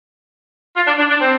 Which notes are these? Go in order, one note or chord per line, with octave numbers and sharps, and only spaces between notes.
F4
D4
D4
D4
C4